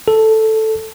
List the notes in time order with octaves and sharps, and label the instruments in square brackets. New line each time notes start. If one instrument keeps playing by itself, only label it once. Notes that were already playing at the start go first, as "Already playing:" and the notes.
[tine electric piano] A4